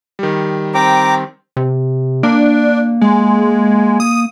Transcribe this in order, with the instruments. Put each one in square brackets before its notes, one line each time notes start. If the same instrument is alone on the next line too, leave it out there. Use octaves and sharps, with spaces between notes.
[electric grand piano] D#3 G3
[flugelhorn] C4 [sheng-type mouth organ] G5 A#5 D6
[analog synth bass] C3
[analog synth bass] A#3 [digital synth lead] D4
[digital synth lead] G#3
D#6